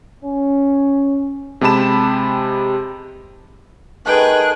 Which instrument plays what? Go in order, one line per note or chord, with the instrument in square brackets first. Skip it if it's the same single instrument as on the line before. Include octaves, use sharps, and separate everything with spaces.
[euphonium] C#4
[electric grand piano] C3 G#3 G4 A5 B5 E7
[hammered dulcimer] D#3 A3 A5 [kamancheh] G#4 F#6 [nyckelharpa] B4 G5